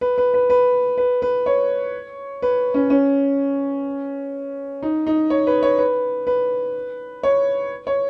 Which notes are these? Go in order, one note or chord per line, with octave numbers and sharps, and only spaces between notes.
B4
B4
B4
B4
B4
B4
C#5
B4
C#4
C#4
D#4
D#4
C#5
B4
C#5
B4
B4
C#5
C#5